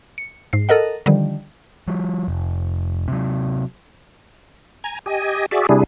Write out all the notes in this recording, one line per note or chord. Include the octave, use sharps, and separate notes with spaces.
C#7
G#2 C7
A4 A#4 D#5 F#5
D3 D#3 F3 G3
F3 G3
F1
C3 F#3
G#5 A#5 G#6
G4 D#5 G#5
F#4 G#4 D5 E5
C3 G3 D4 E4 G#4